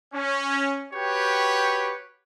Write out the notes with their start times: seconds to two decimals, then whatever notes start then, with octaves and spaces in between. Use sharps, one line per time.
0.14 C#4
0.94 F#4 G4 B4 C#5 G5